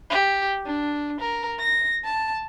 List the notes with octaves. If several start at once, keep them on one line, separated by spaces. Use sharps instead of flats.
G4
D4
A#4
A#6
A5